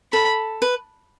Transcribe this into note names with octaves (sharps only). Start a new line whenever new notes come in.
A4 B5
B4